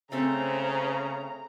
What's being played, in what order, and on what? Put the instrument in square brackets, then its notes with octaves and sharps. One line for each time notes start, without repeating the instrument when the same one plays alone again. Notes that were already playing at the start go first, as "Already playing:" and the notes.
[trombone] C#3 [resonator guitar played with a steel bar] A3 C4 C#4 [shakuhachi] C5 [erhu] A#5